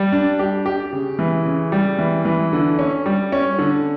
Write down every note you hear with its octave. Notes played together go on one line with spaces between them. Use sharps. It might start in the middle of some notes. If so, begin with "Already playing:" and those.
Already playing: G3
D4
G4
G4
C#3
E3
C#3
G3
E3
E3
D3
C#4
G3
C#4
D3